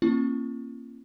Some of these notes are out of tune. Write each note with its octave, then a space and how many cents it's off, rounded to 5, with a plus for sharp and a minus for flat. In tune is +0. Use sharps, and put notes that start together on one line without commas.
A#3 +0 C#4 -40 E4 +45